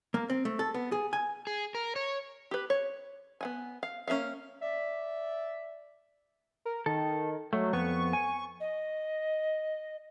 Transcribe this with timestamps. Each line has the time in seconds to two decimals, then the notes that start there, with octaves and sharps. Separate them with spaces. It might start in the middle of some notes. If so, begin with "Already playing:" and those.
0.14 A#3
0.30 C4
0.45 A3
0.59 A4
0.74 B3
0.92 G#4
1.13 G#5
1.47 G#4
1.75 A#4
1.96 C#5
2.51 G4 B4
2.70 C#5
3.41 B3 F#5 G#5
3.83 F5
4.08 A#3 C#4 A#4 E5 F5
4.62 D5 E5
6.65 A#4
6.86 D#3 A4
7.53 F#3 A3
7.73 F2 B3 C#6
8.13 G#5
8.60 D#5